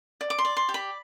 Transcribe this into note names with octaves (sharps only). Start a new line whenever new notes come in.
D5
D6
C6
D5
C6
G4
B5